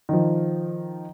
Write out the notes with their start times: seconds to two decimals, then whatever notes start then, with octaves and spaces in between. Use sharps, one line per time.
0.09 D#3 F3